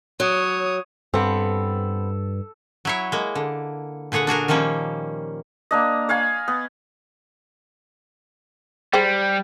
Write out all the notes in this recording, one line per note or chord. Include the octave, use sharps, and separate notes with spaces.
F#3 C#5 D#6
G2 B3 C4 A4
F#3 E4 C#5
G#3 A#3
D3
A#2 D3 G#4 C#5 F#5
D4 F#4 G#4 A#4
D#3 F3 G3 A#3 C#4
A#3 D4 D#5
C#5 F5 G#5 B5
B3
G3 G#4 C5 G5